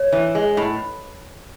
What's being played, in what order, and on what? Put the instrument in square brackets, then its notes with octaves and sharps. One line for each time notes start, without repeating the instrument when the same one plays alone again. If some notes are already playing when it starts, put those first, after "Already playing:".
Already playing: [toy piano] C#5
[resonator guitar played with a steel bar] E3
G#3
A2